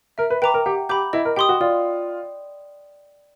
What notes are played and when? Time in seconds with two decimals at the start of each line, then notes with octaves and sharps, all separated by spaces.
0.18 A#4 E5
0.30 B4
0.42 B4 G5 A#5 D6
0.54 A#4
0.66 G4 F#5
0.89 G4 B5 D6 G6
1.13 E4 D#5
1.25 A#4
1.36 G4 G5 C6 D#6
1.49 F#4
1.61 F4 D5